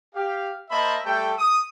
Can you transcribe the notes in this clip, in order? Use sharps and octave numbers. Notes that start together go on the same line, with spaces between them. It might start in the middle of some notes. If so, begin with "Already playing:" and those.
G4 F5
A#3 C5 D#5 E5 A5 B5
G3 A3 A4 G5
D#6